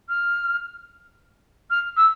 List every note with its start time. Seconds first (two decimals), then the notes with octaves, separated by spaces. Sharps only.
0.09 F6
1.70 F6
1.97 E6